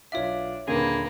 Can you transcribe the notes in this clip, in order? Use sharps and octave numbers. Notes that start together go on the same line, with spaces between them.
B1 D4 F4 C#5 E5 F5
D#1 D#2 D3 A#3 G#4 B4